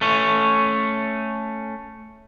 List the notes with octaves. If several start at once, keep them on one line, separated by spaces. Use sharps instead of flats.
A3 C#4